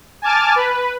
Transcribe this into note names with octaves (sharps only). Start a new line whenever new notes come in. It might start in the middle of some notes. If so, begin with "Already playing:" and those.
G#5 A5 D6 F6 A6
B4